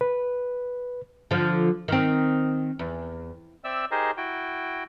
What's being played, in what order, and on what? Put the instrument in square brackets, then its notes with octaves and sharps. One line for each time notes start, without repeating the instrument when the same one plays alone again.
[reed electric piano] B4
[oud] D3 F3
D#3 C4
E2
[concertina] C4 D5 E5 E6
D#4 G4 G#4 A#4 C5 D#5
E4 F#4 G5